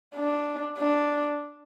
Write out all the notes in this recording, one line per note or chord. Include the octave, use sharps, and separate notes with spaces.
D4
D4